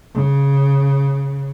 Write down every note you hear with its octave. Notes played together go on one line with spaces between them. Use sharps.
C#3